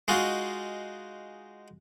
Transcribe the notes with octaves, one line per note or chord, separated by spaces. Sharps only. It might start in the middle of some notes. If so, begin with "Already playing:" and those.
G#3 D#4 F4 F#4